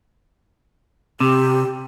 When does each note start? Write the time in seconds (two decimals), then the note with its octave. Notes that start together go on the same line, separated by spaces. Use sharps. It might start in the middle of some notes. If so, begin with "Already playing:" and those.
1.20 C3 G4